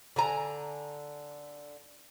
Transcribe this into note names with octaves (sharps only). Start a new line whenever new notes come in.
D3 G#5 A#5